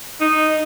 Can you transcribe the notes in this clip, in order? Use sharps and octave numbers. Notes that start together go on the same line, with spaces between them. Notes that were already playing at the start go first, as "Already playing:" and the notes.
D#4